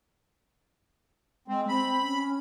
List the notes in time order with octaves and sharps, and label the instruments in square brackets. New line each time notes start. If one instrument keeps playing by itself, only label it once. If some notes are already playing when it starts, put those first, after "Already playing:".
[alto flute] G#3 [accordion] C4
[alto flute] C4 [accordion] B5
[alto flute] C#4